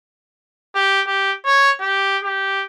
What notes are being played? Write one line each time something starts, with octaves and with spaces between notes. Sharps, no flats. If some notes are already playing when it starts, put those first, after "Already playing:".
G4
G4
C#5
G4
G4